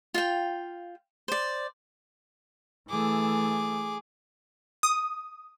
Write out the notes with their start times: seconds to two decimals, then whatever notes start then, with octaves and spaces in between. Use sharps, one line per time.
0.14 F4 F5 G5
1.28 C5 D5
2.89 E3 A3 G#4 D6
4.83 D#6